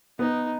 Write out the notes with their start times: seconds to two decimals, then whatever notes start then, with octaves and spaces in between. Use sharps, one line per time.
0.19 B3 D#4 B4